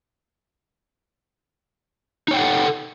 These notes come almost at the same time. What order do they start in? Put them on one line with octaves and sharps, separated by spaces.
D#4 C#5 G5 F#5 A4